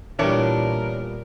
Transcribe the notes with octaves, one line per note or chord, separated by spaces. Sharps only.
A#2 E3 G3 B3 D4 A#4 C#5